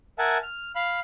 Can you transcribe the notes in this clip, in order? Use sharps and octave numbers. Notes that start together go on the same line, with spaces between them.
A#4 E5 F#5 G#5 A5
F6
F5 B5 F6